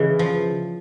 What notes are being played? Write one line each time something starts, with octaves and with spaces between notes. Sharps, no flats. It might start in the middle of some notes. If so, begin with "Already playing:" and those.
Already playing: C#3 E3
F3